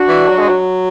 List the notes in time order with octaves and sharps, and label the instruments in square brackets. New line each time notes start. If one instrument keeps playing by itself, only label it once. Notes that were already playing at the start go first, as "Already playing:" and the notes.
Already playing: [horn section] D4 F#4
[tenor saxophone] E3
F#3
G#3
F#3